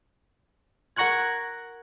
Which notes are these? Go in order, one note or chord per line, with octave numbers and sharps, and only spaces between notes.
A#4 F#5 A#5 C#6 F#6 G#6